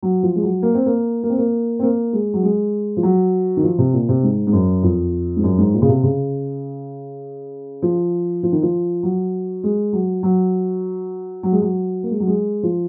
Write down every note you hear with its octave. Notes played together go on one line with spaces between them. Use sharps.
F#3
F3
G#3
F#3
A#3
C4
A#3
A#3
C4
A#3
C4
A#3
G#3
F#3
G#3
F3
F#3
D#3
F3
C3
A#2
C3
G#2
G#2
F#2
F2
G#2
F#2
G#2
A#2
C#3
C3
C#3
F3
F3
D#3
F3
F#3
G#3
F#3
F#3
F#3
G#3
F#3
A#3
G#3
F#3
G#3
F3